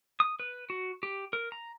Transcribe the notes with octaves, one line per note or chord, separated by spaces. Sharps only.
D#6
B4
F#4
G4
A#4
A#5